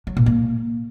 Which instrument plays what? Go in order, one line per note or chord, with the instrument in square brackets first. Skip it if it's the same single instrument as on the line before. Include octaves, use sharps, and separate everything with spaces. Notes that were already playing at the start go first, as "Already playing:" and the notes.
[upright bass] F#3
A#2
A#3